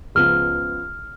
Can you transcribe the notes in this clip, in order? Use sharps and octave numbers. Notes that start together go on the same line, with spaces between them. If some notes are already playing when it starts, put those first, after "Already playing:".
C#2 C#3 F3 B3 F4 F6